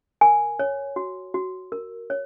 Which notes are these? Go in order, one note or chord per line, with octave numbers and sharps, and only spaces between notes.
A#4 G#5
C#5
F#4
F#4
A#4
C#5